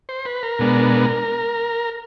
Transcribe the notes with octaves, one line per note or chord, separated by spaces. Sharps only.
C5
B4
A#4
B2 G#3 B3 D4